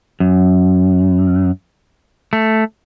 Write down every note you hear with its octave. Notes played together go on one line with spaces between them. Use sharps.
F#2
A3